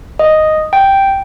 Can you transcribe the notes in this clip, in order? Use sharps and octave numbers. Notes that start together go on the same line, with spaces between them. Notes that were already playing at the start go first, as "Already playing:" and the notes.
D#5
G5